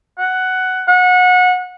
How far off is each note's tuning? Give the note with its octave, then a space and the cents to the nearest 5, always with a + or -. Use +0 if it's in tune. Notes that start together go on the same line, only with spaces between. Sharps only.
F#5 +10
F#5 -25